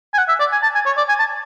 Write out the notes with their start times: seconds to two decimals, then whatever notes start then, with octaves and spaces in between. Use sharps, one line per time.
0.14 G#5
0.18 F#5
0.28 E5
0.40 D5
0.52 G#5
0.63 A5
0.75 G#5
0.86 C#5
0.97 D5
1.09 G#5
1.19 A5